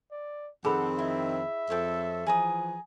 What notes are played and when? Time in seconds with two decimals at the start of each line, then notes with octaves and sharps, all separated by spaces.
0.11 D5
0.65 F2 D#3 C4 G#4 A4 F#5 B5
0.99 E4 D#5 E5
1.70 F2 A4 C#5 G5
2.26 E3 F3 G#4 A#5 D#6